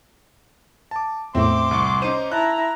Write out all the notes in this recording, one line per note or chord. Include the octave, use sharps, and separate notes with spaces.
A5 D6
E2 A2 A3 C4 E5 C6 D6
C2 C#6
C#4 D#4 C5 D#7
E4 A5 A#5 F#6